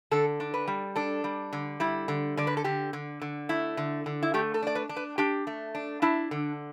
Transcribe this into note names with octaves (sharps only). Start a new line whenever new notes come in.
D3 A4
D4
B4
G3
D4 A4
G3
D3
G3 E4
D3
D3 D5
B4
A4
D3 G4
D3
D3
A3 E4
D3
D3
E4
A3 G4
A4
D4 D5
B4
D4
B4
D4 G4
A3
D4
D4 E4
D3